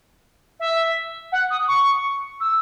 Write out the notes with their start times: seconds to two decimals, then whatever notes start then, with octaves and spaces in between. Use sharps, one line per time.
0.60 E5
1.32 F#5
1.50 D#6
1.68 C#6
2.40 E6